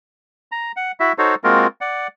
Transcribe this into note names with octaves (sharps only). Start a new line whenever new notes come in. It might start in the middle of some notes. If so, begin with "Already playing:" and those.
A#5
F#5
E4 F#4 E5
D#4 F#4 A4 C5 C#5
G#3 A#3 C4 F4 F#4 A#4
D5 F#5